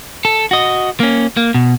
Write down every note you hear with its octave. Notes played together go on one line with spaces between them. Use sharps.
A4
F#4 D#5
A#3 C#4
A#3
B2